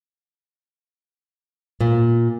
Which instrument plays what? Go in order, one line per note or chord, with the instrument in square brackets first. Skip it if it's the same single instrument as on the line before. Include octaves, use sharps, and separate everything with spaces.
[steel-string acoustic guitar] A#2